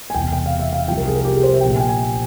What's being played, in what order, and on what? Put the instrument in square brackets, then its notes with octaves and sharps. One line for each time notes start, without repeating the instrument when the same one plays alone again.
[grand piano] G#5
E1 E2 C3 G5
G5
F5
E5
F5
C2 C3 F3 G5
A#4
G#4
A#4
G4
G#4
C5
E5
A#1 A#2 F3 G5
G#5
G5
G#5